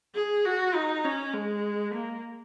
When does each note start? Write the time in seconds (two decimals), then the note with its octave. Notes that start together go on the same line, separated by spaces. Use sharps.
0.15 G#4
0.46 F#4
0.75 D#4
1.05 C#4
1.34 G#3
1.94 A#3